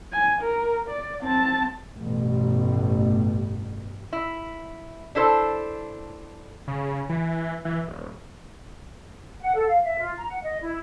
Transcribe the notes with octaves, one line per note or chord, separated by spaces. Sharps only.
G#5
A#4
D5
C4 A5
A1 G2 B2 G3
E4
D4 E4 A4 C5
C#3
E3
E3
D#1
F#5
A4
F5
E5
F4
A#5
F#5
D#5
E4